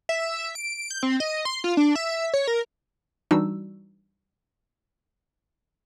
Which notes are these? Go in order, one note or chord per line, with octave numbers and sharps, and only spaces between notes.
E5
D7
G6
C4
D#5
C6
F4
D4
E5
C#5
A#4
E3 G3 D4 D#4 F#4 E6